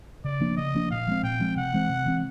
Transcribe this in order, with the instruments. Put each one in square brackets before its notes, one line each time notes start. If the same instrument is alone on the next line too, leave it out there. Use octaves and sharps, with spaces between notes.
[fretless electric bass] C#3 [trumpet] D5
[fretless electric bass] F3 A#3 D4
[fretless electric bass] C#3 [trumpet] D#5
[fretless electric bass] F3 A#3 D4
[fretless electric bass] A#2 [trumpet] F5
[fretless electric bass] F3 G#3 C4
[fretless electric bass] A#2 [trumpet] G5
[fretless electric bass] F3 G#3 C4
[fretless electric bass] C3 [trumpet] F#5
[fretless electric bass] E3 G#3 C4
C3
E3 G#3 C4